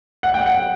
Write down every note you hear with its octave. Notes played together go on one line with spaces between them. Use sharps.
F#5
G5
F#5